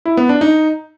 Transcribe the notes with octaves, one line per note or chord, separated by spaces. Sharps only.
E4
B3
D4
D#4